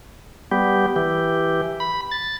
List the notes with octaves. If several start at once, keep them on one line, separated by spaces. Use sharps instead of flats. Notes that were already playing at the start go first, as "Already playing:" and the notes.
G3 B3 G4
E3 G4
B5
A6